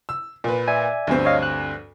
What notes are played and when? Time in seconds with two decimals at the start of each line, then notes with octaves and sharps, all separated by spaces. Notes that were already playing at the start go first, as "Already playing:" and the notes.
0.09 E6
0.44 A#2 B4
0.68 D5 E5 G#5
1.07 D2 G2 C4
1.25 C#5 D#5 F5
1.43 F#6